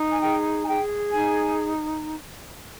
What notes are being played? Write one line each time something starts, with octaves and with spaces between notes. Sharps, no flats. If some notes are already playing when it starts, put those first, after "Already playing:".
Already playing: D#4
G#5
G#4 G5
G#5
G#4 G5
D#4 G#5